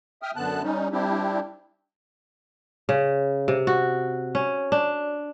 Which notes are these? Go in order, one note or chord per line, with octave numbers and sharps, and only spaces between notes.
E5 G5 D#6 F6
F#2 D3 B3 A5 F#6
G3 C#4 D#4
G3 C4 D4 E4 G4
C#3
C3
F#4
C#4
D4